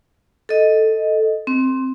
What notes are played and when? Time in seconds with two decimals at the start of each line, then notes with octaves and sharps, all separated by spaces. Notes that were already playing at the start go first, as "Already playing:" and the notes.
0.49 A4 D#5
1.47 C4